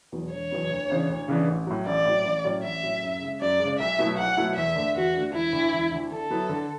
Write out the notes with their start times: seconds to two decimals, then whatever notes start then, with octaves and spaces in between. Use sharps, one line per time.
0.12 E2 B2 F#3 B3
0.32 E1 C#5
0.51 E2 B2 F#3 B3
0.71 D2
0.90 C#3 E3 B3 D4
1.10 D2
1.28 C#3 E3 B3 D4
1.48 A1
1.67 A2 F#3
1.86 A1 D5
2.05 A2 F#3
2.25 A1
2.44 A2 F#3 C#4
2.63 A1 E5
2.83 A2 F#3 C#4
3.03 F#2
3.21 C#3 G#3
3.41 F#2 D5
3.60 G#3
3.65 C#3
3.79 B1 E5
3.99 B2 F#3 A3 E4
4.18 B1 F#5
4.37 B2 F#3 A3 E4
4.56 E2 E5
4.76 D3 A3 D4
4.95 E2 F#4
5.14 D3 A3 D4
5.34 E1 E4
5.52 D2 D3
5.72 E1
5.91 D2 D3
6.11 D3 A4
6.30 F#3 B3 E4
6.49 D3